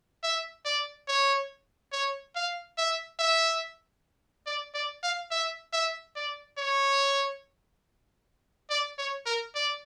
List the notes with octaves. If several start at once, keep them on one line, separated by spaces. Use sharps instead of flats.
E5
D5
C#5
C#5
F5
E5
E5
D5
D5
F5
E5
E5
D5
C#5
D5
C#5
A#4
D5